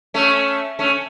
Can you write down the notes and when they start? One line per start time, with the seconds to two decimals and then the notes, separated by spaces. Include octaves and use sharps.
0.14 A3 C#4
0.79 A3 C#4